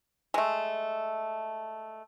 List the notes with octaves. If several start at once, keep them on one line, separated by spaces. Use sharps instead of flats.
G#3 A3